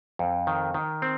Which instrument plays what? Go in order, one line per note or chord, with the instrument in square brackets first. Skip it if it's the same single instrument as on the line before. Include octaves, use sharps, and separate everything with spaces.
[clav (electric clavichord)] F2
D#3
D#3
C4